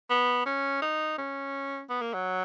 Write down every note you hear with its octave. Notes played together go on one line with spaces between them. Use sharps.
B3
C#4
D#4
C#4
B3
A#3
F#3